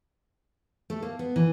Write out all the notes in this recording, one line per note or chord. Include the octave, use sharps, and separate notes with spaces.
A3
A#3
B3
E3